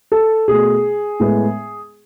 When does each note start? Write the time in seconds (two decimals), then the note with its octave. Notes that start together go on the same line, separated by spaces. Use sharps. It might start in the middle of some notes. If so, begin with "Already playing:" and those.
0.12 A4
0.48 B2 A3 G#4
1.20 A2 G#3 B3